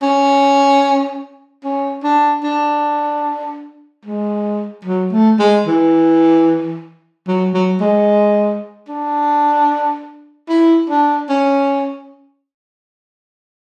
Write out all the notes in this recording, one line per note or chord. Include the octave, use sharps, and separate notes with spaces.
C#4
C#4
D4
D4
G#3
F#3
A3
G#3
E3
F#3
F#3
G#3
D4
E4
D4
C#4